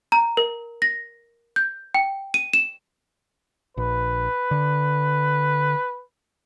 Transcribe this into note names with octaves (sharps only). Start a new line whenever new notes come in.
A#5
A#4
A#6
G6
G5
D#7
E7
A#1 B4
D3